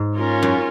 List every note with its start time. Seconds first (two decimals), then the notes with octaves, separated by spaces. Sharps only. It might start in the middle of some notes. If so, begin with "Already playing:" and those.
Already playing: G#2
0.15 C#4 F4 A#4
0.42 F#2